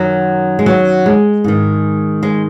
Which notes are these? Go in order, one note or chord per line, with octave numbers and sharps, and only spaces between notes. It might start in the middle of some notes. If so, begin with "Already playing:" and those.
Already playing: F#2 D#3 F#3
G#3
F#3
G#3
G#2 D#3
G#3